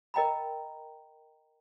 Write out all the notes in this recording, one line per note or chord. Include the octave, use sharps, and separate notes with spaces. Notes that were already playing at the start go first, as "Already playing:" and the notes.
A#4 D#5 G5 A#5 B5